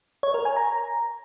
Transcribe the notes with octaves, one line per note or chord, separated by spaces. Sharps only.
C#5
A#4
G#5
A#5